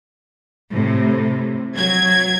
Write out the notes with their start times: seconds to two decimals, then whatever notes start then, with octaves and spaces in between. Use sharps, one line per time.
0.71 A2 C3
1.75 F#3 G#6